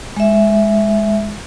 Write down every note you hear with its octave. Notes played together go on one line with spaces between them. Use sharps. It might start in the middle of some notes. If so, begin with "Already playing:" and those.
G#3 E5